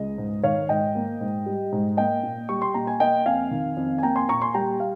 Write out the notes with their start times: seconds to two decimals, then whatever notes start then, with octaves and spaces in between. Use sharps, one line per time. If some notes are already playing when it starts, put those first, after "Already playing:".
Already playing: C#2 G#3 D#5
0.18 G#2
0.43 D#3 C#5 F5
0.69 G#2 D#5 G5
0.95 A#3
1.21 G#2
1.46 G3
1.72 G#2
1.97 A#3 D#5 G5
2.23 A#2
2.49 G3 C#6
2.62 C6
2.74 A#2 A#5
2.87 G#5
3.00 A#3 D#5 G5
3.26 F2 F5 G#5
3.51 D#3
3.77 F2
3.98 G#5
4.03 A#3 G5 A#5
4.16 G#5 C6
4.28 A#2 A#5 C#6
4.42 G#5 C6
4.54 G3 G5 A#5
4.80 F5